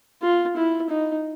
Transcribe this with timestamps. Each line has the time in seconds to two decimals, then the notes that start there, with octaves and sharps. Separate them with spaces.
0.22 F4
0.57 E4
0.90 D#4